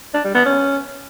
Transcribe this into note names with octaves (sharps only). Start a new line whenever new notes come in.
D4
G3
B3
C#4